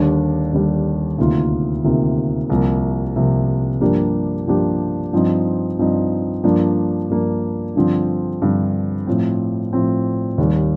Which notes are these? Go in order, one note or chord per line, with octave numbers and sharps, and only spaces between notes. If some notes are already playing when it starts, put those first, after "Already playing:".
Already playing: D#2 D3 G3 D4
D#2 D3 G3 D4
D2 C3 D#3 A#3 F4
D2 C3 D#3 A#3 F4
C2 C3 F3 A#3
C2 C3 F3 A#3
G2 F3 A#3 D4 G4
G2 F3 A#3 D4 G4
G2 F3 C4 D#4
G2 F3 C4 D#4
G2 F3 A#3 D4
G2 F3 A#3 D4
G2 D3 F3 C4
G2 D3 F3 C4
A2 F3 C4
A2 F3 C4
D#2 D#3 G3